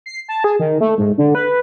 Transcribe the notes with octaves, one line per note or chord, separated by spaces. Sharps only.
C7
A5
G#4
D#3
A3
G#2
D3
B4